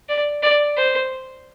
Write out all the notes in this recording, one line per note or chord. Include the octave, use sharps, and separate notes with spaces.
D5
D5
C5